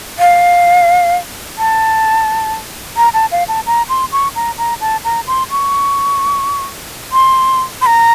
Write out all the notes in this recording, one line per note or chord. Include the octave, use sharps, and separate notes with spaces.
F5
A5
A#5
A5
F5
A5
A#5
C6
C#6
A#5
A#5
A5
A#5
C6
C#6
C6
C6
A#5